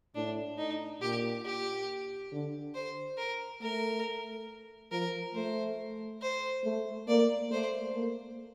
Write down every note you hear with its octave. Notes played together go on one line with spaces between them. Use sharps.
A2 D4
D#4
A#2 G4
G4
D3
C5
A#4
A3 A#4
F3 A#4
A3 C5
C5
A3
A#3 D5
A3 C5
A#3